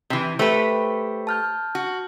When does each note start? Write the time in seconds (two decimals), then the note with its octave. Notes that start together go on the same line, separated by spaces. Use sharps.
0.10 C3 E3
0.39 A3 G4 B4 C5 B6
1.27 A5 F6 G6
1.75 F#4